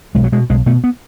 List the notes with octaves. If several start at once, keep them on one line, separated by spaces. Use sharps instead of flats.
B1 G#3
F#3
B2 G#3
B1 G#3
B2 A3
B3